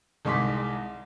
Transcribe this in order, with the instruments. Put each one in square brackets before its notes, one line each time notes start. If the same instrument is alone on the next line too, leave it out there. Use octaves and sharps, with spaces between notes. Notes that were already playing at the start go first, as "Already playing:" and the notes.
[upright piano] C2 G#3 D#4 C6 D6 B6